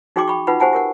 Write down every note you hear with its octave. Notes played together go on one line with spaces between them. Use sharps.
D#4 F#4 G#4 G5 C6 D6
G5 B5 C#6
D#4 F4 B4 F#5 B5
G4 C5 F#5 G#5 A5
G4 A#4 F#5